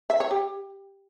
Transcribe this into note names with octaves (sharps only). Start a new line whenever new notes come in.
E5
C#5
G4